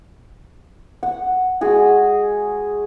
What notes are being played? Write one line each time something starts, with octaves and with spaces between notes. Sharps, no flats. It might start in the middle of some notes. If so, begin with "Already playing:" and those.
F#5
G#3 F#4 G#4 F#5